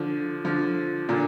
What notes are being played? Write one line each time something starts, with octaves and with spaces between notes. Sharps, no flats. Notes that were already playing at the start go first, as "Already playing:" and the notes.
Already playing: D3 F3
D3 F3
A#2 D3